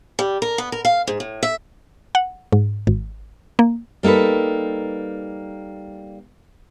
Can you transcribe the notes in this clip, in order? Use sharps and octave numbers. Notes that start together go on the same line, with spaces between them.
G3
A#4
B3
A#4
F5
G#2
A2
E5
F#5
G#2
G#1
A#3
G3 A#3 D#4 A4 B4